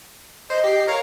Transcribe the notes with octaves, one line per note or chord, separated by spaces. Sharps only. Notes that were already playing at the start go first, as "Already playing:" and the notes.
C5 D#5
G4 C7
A#4 C#5 F5